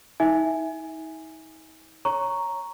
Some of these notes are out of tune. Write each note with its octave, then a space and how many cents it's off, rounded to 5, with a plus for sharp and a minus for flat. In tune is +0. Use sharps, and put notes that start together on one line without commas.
D#4 +40 E5 -5 G#5 -10
C#5 +0 A#5 +0 C#6 +0